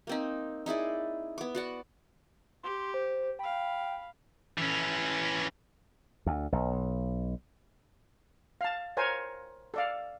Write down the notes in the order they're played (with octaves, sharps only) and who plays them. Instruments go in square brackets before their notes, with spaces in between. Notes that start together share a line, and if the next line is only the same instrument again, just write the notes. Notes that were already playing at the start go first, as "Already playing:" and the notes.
[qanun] A#3 C4 D#4
D#4 E4 G#4 D5
B3 D6
F#4 D5 F#5
[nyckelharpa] G4 [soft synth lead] C6
[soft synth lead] C5
[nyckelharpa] F5 B5 [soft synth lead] G5
[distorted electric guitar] E3 C#4
[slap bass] D2
B1
[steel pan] F5 A5
A#4 C5 C#5 G#5
A4 D5 F5